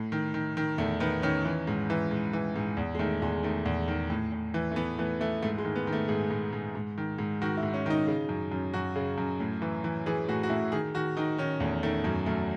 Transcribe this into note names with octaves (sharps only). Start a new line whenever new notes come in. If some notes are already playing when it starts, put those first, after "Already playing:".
Already playing: A2
D#3
D#3
D#3
E2 A3
D#3 B3
D#3 C#4
E3
G#2
E3
G#2
E3
G#2
E2
G#3
D#3 A3
E2 G#3
D#3 A3
E2
D#3
A2
A2
E3
A3
E3 B3
E3 A3
E3 A3
G#2 A3
G#3
D#3
B3
D#3
A3
G#2 G#4
G#2
G#2
G#2
D#3
G#2
D#3 F#4
E4
G#2
C#4
D#3 D#4
C#3
F#2
F#2
F#2 F#4
C#3
F#2
A2
E3
E3
E3 G#4
A2 F#4
F#4
A2 E4
D#3 G#4
D#3 F#4
D#3 D#4
D#3 C#4
E2 A3
D#3 A3
F#2 A3
F#2 A3